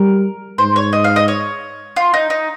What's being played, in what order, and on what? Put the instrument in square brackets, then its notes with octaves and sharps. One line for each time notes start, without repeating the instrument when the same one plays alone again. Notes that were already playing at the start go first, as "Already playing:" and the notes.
Already playing: [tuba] G3 [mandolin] A#4
[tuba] G#2 [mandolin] C5
[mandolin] C#5
D#5
F5
D#5
C#5
F4
D#4
D#4